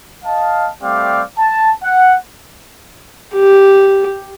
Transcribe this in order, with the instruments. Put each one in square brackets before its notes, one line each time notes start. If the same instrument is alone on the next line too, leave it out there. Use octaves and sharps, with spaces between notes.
[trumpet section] D#5 F5 A5
G3 A3 C4 G4 D5 F5
A5
F#5
[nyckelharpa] G4